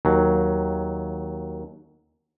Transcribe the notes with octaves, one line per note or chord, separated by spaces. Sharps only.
D#2 F#3